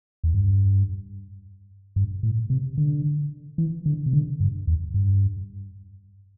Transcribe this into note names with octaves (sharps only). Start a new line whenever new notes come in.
E2
G2
G2
A2
C3
D3
E3
D3
C3
D3
G2
E2
G2